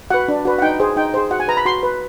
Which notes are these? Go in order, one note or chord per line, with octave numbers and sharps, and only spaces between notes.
F#4 B4 F#5
D4
F#4 B4
F#5
D#4 G5
G#4 C5
D#4 G5
G#4 C5
F#4 F#5
G#5
B4 A#5
B5
F#4 C6
B4